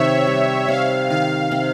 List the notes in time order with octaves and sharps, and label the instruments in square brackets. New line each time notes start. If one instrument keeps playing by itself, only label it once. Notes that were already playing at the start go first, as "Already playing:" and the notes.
Already playing: [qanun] C3 D#3 [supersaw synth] C#5 E5
[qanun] G3
[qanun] C3 [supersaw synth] F5
[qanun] D#3 [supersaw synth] F5
[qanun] C3